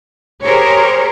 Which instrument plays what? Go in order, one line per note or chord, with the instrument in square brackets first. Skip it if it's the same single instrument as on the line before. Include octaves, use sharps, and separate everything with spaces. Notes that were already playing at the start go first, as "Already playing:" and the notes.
[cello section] G4 G#4 A#4 C5 C#5